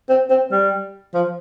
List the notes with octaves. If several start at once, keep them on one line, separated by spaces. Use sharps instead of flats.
C4
C4
G3
F3